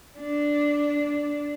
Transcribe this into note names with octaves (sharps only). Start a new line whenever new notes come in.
D4